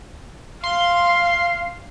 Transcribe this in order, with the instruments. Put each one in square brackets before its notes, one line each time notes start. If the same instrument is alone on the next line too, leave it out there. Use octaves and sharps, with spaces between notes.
[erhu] F5 [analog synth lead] C6